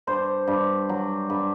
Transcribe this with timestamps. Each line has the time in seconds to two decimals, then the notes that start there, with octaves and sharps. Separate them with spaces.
0.07 G2 C5
0.47 G2
0.89 F#3
1.30 G2